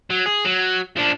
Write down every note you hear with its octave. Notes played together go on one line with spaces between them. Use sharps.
F#3
G#4
F#3
F3 D4